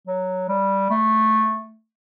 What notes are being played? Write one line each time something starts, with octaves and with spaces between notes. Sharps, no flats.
F#3
G3
A3